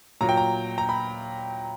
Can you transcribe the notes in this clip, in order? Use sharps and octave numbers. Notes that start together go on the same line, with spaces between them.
A#2 F#3 A#5
G5
A#5
A#5
B5